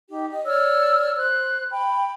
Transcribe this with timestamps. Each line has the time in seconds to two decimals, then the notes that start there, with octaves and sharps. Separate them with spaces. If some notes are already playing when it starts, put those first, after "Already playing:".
0.09 D#4 G4
0.30 D#5
0.46 C#5 D5 E6 F6
1.16 C5 F#6
1.69 G5 B5